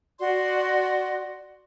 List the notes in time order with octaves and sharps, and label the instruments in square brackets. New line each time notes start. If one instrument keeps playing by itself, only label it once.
[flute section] F#4 D5 C6